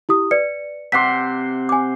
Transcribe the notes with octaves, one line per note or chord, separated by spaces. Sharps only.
E4 G4 D#6
B4 D5 C#7
C3 F#5 C6 D6 B6
G#5 D6